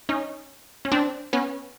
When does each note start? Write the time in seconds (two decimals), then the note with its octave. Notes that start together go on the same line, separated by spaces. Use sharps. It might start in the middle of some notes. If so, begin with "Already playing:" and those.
0.09 C#4 D#4
0.85 C#4
0.92 C4 D4
1.33 B3 C#4